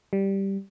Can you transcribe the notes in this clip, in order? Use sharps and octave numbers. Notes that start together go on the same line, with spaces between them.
G3